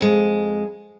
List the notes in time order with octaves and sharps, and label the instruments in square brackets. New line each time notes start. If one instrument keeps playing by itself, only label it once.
[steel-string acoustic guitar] F2 G#3